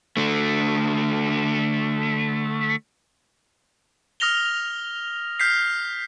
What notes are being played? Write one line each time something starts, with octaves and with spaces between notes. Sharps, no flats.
D3 A3
D#6 F6 A#6 F7 G7
F6 G6 B6 C7